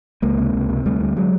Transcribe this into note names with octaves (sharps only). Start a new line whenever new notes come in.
C#2 G#3 A#3
C3
C#2
C3
D2 G3 A3
D3
F#3 G#3